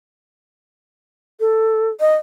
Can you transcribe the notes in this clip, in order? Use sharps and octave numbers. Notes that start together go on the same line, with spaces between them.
A4
D#5